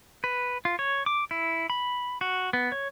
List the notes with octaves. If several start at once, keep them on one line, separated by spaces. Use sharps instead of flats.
B4
F4
C#5
D6
E4
B5
F#4
B3
C#5